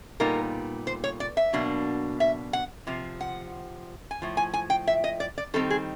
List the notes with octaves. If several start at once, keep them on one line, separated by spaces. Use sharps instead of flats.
A#2 G3 B3 D#4 A#4
C5
C#5
D5
E5
B2 F#3 A#3 D4
E5
F#5
C3 F3
F#5
G#5
A2 F3
G#5
G#5
G5
E5
D#5
D5
D5
D#3 G3 C4 D#4 A4
G#4